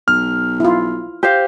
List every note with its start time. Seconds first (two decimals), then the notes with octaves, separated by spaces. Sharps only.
0.08 B1 F6
0.60 E4 F4
1.23 G4 C5 F5